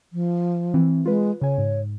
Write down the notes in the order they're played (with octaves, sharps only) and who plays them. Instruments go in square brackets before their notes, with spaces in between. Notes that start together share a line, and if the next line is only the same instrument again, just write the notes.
[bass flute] F3
[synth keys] E3 C4
[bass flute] G#3 [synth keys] F4 B4
[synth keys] C#3 G#5 [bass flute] C#5
[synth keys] G#2